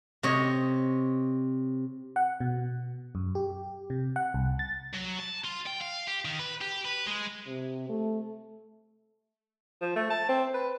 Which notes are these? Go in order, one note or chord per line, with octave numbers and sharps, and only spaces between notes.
C3 C#5 D#5
F#5
B2
F#2
G4
C3
F#5
C2
A6
F#3
A5
F4
G5
F5
G4
D#3
B4
G4
B4
G#3
C3
A3
F3
A3
A5
C4
B4